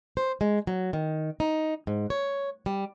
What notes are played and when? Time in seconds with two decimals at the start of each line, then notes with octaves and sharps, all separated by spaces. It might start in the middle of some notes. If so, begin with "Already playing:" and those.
0.17 C5
0.41 G#3
0.67 F#3
0.93 D#3
1.40 D#4
1.87 G#2
2.10 C#5
2.66 G3